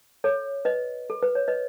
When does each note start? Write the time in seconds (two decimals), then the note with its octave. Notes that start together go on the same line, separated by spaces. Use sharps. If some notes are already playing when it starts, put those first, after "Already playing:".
0.24 A4 C#5
0.65 B4 D#5
1.10 A4
1.23 B4
1.35 C#5
1.48 B4 D#5